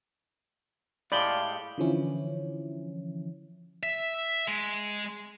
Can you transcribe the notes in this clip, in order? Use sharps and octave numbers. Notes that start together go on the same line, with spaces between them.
A2 G#3 G4 D5 F5 B5 F#7 G7
D3 E3 F3 C#4 E4
E5
G#3